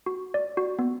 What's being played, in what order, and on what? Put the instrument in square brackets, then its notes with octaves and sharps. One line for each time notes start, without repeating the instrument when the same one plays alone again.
[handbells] F#4
D5
F#4
B3